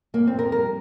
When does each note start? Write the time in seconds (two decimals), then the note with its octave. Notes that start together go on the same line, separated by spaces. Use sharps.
0.14 F2 A#3
0.27 C4
0.33 F2
0.39 A#4
0.52 G3 A#4